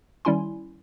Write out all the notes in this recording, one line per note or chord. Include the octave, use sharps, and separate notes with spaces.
D#3 G3 C#4 E4 G#5 C6